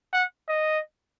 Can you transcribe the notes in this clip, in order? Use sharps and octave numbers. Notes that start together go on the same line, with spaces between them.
F#5
D#5